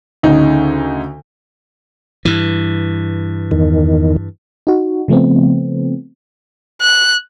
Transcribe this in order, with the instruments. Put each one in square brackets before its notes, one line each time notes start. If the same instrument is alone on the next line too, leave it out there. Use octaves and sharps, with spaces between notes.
[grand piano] D2 C#3 D#4
[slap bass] G2 E3
[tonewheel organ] E2 D#3
[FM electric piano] D#4 F#4
C#3 F3 A3 B3 C4
[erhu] F#6